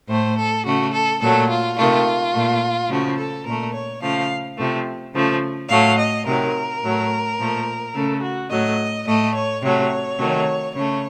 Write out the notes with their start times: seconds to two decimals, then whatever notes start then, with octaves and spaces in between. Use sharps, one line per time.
0.08 A2 A3 C5
0.37 A4
0.64 C#3 A3 F#4
0.93 A4
1.21 A#2 F#3 A3 A4
1.49 F4
1.77 C3 D#3 A3 F4
2.33 A#2 A3
2.89 C#3 F3 A3 F#4
3.18 A4
3.45 A#2 A3 A#4
3.73 C#5
4.02 C#3 F3 A3 F5
4.57 C3 F3 A3
5.14 C#3 F3 A3
5.69 A2 F#3 A3 F5
5.98 D#5
6.26 C3 D#3 F#3 A#4
6.82 A2 F#3 A3
7.38 A#2 F3 A3
7.94 C#3 A3 A4
8.22 F#4
8.51 A2 F#3 A3 D#5
9.06 A2 A3 D#5
9.34 C#5
9.62 C3 F#3 A3 C#5
10.18 C3 D#3 F#3 A3
10.75 C#3 A3 C#5